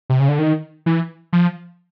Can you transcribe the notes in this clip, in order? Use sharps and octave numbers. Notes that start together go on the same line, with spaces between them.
C3
C#3
D3
D#3
E3
F3